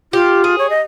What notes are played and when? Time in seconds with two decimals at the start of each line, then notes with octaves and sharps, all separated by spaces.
0.13 F4 G4
0.44 G#4
0.58 C#5
0.70 D#5